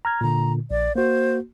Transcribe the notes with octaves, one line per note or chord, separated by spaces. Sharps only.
A#5 F6 G#6
A#2 D3 A#5
A#1 D5
A#3 F#4 C5